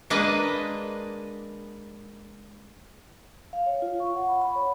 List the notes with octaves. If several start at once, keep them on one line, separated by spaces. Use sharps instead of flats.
G#3 A#3 D4 B4 D#5
F5
C#5
F4
C#6
F#5
B5
B5
C#5